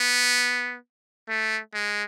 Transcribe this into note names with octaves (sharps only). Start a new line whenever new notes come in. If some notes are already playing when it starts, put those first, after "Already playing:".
Already playing: B3
A3
G#3